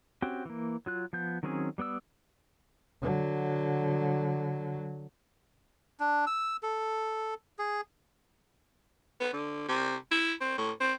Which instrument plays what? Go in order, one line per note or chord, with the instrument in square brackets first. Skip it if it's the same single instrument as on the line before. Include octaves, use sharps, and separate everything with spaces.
[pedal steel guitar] C4 C#4 F#4 G4 G5
E3 A#3
F#3 F4 F#6
F3 B3 G6
D#3 F#3 C4 C#4 G#4
G3 B3 D5 E6
[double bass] D3 F#3
[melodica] D4
E6
A4
G#4
[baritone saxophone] B3
D3
C3
E4
C4
A2
C4